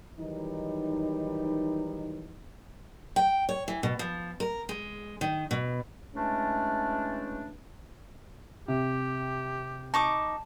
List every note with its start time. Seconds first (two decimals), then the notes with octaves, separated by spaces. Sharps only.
0.18 D#3 E3 F#3 G3 D#4
3.16 G5
3.49 C#5
3.68 E3
3.83 B2
3.99 F3
4.40 A#4
4.69 G#3
5.21 D#3
5.51 B2
6.14 C#3 E3 G#3 A3 C#4 D4
8.68 C3 G4
9.94 D#4 A5 C#6 D6